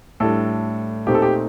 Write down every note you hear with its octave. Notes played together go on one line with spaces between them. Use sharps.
A2 G3 D4 A4
A#2 A3 C4 D#4 G4
A4
G4